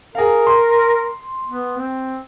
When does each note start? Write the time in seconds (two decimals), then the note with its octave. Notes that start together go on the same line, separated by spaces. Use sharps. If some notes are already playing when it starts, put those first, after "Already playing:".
0.15 G#4 A#4 F5
0.47 C6
1.47 B3
1.78 C4